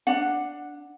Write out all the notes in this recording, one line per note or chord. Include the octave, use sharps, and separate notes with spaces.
D4 F#5